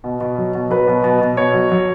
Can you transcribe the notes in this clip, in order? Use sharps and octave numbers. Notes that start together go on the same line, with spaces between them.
B2
B2
F#3
B2
F#3 B4
B2
B2
B2
B2 C#5
F#3
F#3